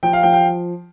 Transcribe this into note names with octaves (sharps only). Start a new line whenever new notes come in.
F3 G5
F5
F3 G5
G5